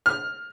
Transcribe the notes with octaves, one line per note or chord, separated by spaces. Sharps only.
F6